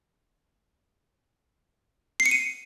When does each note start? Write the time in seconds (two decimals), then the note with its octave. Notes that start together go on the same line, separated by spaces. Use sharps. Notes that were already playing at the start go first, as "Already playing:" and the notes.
2.20 C7
2.26 C#7
2.31 D#7